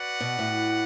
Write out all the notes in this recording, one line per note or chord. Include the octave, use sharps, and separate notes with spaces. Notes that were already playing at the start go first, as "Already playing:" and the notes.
Already playing: F#4 B4 D5 F#5
B2
A2